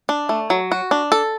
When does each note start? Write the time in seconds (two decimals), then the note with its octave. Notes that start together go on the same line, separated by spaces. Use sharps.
0.09 D4
0.29 A3
0.50 F#3
0.72 F#4
0.91 D4
1.12 A4